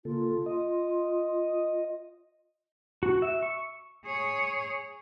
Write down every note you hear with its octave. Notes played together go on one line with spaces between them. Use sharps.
C#3 A#3 F4 A4
D#5
F#4
E5
C#6
G#4 C#5